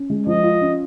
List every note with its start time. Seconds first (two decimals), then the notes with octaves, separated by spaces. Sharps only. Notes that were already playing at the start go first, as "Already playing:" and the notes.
Already playing: C#4
0.10 G#3
0.26 F3 D#5
0.43 F4
0.61 C#4